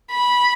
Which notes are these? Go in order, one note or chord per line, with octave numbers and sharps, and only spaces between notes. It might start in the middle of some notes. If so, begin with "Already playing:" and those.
B5